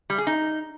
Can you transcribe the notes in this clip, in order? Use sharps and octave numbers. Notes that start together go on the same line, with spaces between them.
G3
G#4
D#4